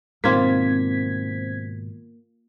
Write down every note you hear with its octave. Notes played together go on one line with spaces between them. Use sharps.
G#2 B2 D#3 A#3 C4 F4 G#6 B6